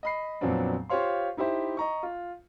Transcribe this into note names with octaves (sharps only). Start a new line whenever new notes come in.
D#5 B5 C7
F2 A#2 F#3 B3 C4 D4
F4 G4 C5 C#5 F5 C6
D#4 E4 G4 C5 E5
D#5 A#5 C#6
F4